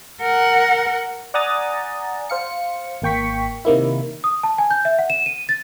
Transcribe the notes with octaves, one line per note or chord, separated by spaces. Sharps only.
A#4 F#5
D5 F#5 G#5 A#5 D#6 A6
C5 F5 C#7
G#1 A#3 G5 C#6 B6
C3 D#3 A#3 E4
D#6
A5
G#5
G6
E5
F#5
E7
D#7
A6